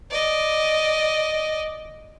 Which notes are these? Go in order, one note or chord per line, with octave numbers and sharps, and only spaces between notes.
D5 D#5